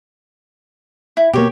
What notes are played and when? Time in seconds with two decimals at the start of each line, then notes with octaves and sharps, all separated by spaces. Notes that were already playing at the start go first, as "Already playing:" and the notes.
1.17 E4
1.33 B2 A#3 G4 C#5